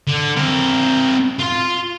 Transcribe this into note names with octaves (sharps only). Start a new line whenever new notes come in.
D3
C4 A#4
F4 C6